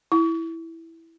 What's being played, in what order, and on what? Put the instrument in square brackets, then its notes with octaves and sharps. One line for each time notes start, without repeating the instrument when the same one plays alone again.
[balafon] E4